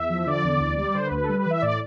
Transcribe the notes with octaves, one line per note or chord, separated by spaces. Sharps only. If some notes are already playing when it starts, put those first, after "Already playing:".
Already playing: E2 E5
F3
D3 D5
E2
D2
G3
D3 C5
B4
D2
B4
A4
G3 B4
B4
E3 E5
A2 D5